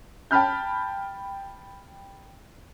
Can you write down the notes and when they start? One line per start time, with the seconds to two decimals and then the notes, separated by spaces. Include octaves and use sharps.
0.31 G5 A5 B5 F6 G6